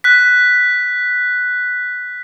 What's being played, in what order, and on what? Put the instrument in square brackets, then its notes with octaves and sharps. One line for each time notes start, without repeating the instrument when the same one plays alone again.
[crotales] F#6 B6